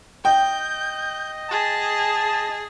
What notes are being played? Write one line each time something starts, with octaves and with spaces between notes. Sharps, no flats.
D#5 G5 G6
G#4 A5